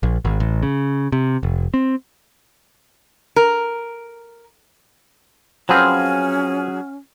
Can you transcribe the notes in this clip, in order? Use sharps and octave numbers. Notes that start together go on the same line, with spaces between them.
A#1
G#1
A1
C#3
C3
F1
C4
A#4
F3 F#3 C4 C#4 G#4 B4 F#5 F6